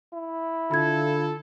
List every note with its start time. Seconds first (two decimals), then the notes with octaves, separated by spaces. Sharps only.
0.13 E4
0.71 D3 F4 A4 B5 G#6